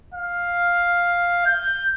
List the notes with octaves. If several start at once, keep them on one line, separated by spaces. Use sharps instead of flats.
F5
G6